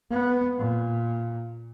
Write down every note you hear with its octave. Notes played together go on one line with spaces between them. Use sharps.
B3
A#2